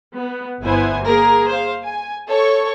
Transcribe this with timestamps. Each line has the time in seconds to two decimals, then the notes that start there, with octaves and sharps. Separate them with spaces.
0.15 B3
0.61 G1 B3 E4 C5 G#5
1.03 A#3 G#4 A#4
1.49 C5 F5
1.84 G#5
2.30 A4 C#5 C#6